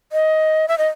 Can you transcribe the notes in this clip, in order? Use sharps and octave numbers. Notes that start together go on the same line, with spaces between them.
D#5
E5
D#5